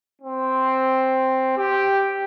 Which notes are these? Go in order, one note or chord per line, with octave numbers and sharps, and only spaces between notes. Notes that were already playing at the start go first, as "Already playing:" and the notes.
C4
G4